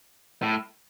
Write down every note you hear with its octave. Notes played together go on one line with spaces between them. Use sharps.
A2